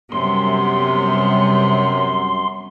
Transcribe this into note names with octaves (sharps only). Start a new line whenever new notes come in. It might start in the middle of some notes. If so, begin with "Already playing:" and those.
F#2 C3 G3 B3 C6